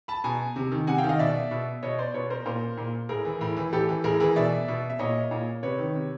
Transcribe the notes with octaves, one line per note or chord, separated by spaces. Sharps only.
A5 B5
B2 G#5 A#5
C3
D#3
C3 F#5 G#5
F5 G5
D#3
D#5 F5
B2 D5 E5
B2
B2 C#5 D#5
C5 D5
B2 B4 C#5
A#4 C5
A#2 A#4 C5
A#2
A2 G#4 A#4
E3
A2
E3
A2 G4 A4
E3
A2 G#4 A#4
E3 G#4 A#4
B2 D5 E5
B2
E5
A#2 C#5 D#5
A#2
C3 B4 C#5
D#3
C3